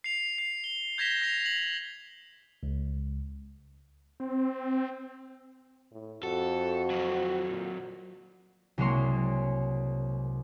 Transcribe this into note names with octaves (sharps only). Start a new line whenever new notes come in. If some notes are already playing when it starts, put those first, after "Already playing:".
C7 F7
C7
G7
G6 G#6 A#6 B6 E7 G7
A#6 C7 F7
F#7
C#2
C4
A2
F2 F#4 A4
F#3 C4
A#2
C2 F#3 G#3 A#3 C#5 C6